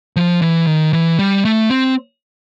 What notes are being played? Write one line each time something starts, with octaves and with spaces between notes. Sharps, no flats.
F3
E3
D#3
E3
G3
A3
C4